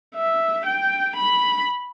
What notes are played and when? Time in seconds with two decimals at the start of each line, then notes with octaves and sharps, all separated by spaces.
0.15 E5
0.65 G5
1.16 B5